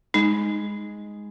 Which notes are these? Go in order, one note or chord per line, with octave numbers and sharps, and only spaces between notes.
G#3 D#4